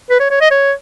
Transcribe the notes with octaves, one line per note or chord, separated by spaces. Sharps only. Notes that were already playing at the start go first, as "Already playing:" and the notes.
B4
C#5
C#5
D#5
C#5